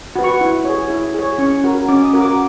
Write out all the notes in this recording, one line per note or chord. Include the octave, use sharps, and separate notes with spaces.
F#4 B4
C#6
E4
G#4 C#5
E4
G#4 C#5
C#4 C#6
F#4 A#4
C#4 D6
D#6
F#4 A#4
D6